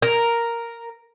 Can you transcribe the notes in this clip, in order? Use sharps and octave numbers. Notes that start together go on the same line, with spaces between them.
A#4